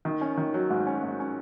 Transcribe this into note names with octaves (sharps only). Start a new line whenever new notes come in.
D#3
C#4
D#3
F#3
G#2
C#4
G#2
C#4